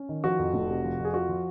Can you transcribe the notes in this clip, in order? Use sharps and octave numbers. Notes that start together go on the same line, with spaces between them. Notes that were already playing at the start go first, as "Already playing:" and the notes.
Already playing: C#4
D#3
F3 F#4
F2
F1
C3
F3
F2
G#4
F4 F#4
F3